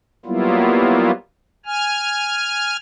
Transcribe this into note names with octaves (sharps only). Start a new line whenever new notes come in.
F#3 G3 A#3 B3 E4 F4
G#5 F6